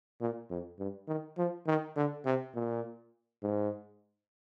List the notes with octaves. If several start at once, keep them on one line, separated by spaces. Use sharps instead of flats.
A#2
F2
G2
D#3
F3
D#3
D3
C3
A#2
G#2